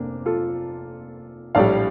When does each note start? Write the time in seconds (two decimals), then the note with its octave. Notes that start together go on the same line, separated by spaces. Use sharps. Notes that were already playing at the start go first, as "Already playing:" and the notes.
Already playing: F1 A#3 C4 D4
0.26 F4 A4
1.55 A#1 A2 G3 D5 F5